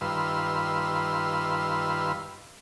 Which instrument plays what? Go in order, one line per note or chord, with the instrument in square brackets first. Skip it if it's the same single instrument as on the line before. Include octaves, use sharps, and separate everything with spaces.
[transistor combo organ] G2 D#3 F4 B4 C6 E6